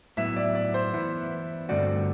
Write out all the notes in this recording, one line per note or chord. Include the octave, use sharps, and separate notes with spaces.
A2 F#3 B3 E4 E5
D5
D5
C5
E3 B3 E4
G2 D3 A3 C4 F#4 D5